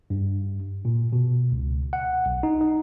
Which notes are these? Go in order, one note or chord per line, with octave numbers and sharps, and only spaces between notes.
G2
A#2
B2
C#2
F#5
B1
D#4
D#4